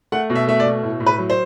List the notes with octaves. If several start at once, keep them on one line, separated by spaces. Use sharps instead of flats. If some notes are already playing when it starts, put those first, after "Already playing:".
A3 F#5
B2
E5
A3 E5
D5
B2
A2
A2
B4
F#3
C5